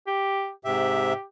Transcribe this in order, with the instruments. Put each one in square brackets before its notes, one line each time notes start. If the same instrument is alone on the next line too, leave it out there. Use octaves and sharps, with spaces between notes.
[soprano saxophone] G4
[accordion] G#2 C3 E5 [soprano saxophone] G4